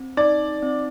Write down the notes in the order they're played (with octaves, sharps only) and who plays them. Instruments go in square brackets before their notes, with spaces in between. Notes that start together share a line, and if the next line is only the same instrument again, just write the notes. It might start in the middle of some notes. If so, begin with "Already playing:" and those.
Already playing: [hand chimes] C4
[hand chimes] D#4 [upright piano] D5
[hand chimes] C4